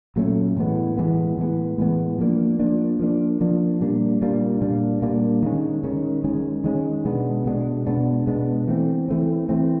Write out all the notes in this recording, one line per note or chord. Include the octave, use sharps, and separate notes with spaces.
A#2 F#3 A3 C#4
A2 E3 G#3 B3
A2 E3 G#3 B3
A2 E3 G#3 B3
A2 E3 G#3 B3
F3 A#3 D4
F3 A#3 D4
F3 A#3 D4
F3 A#3 D4
A#2 G3 A#3 D4
A#2 G3 A#3 D4
A#2 G3 A#3 D4
A#2 G3 A#3 D4
D#3 G#3 C#4
D#3 G#3 C#4
D#3 G#3 C#4
D#3 G#3 C#4
B2 G#3 B3 D4
B2 G#3 B3 D4
B2 G#3 B3 D4
B2 G#3 B3 D4
E3 A3 C4
E3 A3 C4
E3 A3 C4